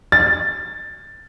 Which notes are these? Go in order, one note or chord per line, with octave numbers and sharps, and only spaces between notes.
A6